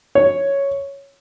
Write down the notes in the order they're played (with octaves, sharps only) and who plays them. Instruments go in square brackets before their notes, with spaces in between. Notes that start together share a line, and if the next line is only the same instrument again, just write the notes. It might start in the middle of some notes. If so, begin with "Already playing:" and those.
[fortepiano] C#5